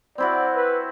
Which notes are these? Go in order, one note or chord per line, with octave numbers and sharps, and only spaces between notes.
C4 E4 F#4 D5
B4